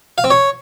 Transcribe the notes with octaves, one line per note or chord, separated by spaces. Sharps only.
F5
C4
C#5